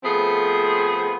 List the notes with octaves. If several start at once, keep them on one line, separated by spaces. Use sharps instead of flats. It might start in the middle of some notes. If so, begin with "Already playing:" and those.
F3 A3 B3 C4 G#4